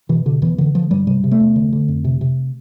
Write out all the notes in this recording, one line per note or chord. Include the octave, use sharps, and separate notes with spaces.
B2 E3
B2 D3
E2 E3
D3 E3
D3 F3
G2 G3
C3 G3
C3
A3
E2
D3
D3
F2
C3
C3